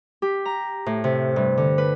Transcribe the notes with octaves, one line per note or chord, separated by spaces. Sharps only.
G4
A#5
A2
C3
G2
D3
B4